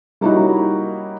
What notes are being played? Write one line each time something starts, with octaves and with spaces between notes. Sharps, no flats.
G3 A#3 C#4 D#4 E4 F#4